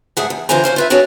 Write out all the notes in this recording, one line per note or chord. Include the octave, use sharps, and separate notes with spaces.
G#2 A3 G#4 F#5
E2
D3 E3 F4 C5 G#5 A#5
D2 C#4 C5 F5
F4 B4 E5
D4 F#4 G#4 B4 C#5 D5